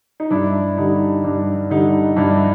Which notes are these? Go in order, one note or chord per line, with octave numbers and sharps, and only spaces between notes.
D#4
G2 D4 E4
D3 G3 D#4
G2 D4
D3 G3 D#4
G2 D4 E4